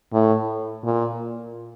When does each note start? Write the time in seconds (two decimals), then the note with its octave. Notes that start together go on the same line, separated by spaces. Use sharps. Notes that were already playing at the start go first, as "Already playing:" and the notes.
0.13 A2
0.84 A#2